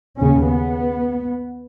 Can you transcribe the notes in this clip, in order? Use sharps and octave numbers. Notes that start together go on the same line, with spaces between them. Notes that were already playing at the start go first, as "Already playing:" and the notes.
D#2 C#3 C#4
B3